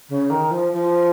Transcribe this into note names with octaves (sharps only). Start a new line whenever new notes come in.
C#3
D#3
F3
F3